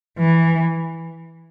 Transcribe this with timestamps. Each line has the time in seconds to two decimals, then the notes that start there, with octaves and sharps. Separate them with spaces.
0.18 E3